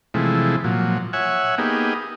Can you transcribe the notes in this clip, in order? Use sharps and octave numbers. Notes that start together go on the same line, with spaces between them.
C3 E3 F3 G#3 A3
A#2 F3 F#3
C#5 E5 F#5 G#5
A#3 B3 D#4 G4 G#4